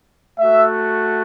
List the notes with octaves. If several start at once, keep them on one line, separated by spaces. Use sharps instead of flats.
A3 F#4 E5